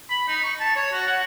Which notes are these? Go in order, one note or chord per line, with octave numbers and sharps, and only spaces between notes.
B5
D#4
C#6
A5
C#5
F#4
F#5